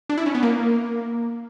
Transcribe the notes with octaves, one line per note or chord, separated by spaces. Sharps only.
D4
E4
C#4
B3
A#3